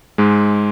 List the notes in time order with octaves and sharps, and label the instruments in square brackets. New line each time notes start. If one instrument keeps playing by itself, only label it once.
[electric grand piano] G#2 G#3